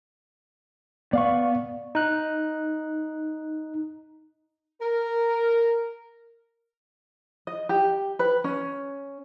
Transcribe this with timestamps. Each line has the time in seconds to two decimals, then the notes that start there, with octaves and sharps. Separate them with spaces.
1.13 B3 D5 F5 C#6
1.95 D#4 F#6
4.82 A#4
7.47 D#5
7.69 G4
8.19 B4
8.44 C#4